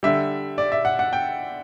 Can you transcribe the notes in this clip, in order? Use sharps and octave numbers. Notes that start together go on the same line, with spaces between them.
D3 G3 E5
D5
E5
F#5
F#5
G5